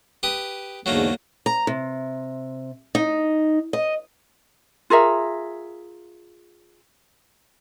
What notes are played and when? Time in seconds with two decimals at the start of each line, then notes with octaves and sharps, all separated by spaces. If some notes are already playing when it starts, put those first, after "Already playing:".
0.23 G4 B4 D#6
0.86 E2 G#2 D3 F#3 A3 A#3
1.46 A#5
1.67 C3
2.95 D#4
3.73 D#5
4.90 F4 G#4 A#4 E5